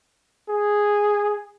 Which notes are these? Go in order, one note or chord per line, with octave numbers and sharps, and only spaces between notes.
G#4